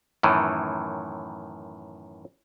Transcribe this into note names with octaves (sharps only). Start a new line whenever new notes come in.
F#2 A2 D#3 E3